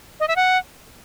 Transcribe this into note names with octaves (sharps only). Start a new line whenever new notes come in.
D#5
E5
F#5